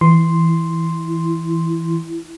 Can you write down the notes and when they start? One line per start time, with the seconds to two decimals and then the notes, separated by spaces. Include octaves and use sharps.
0.01 E3 E4 C6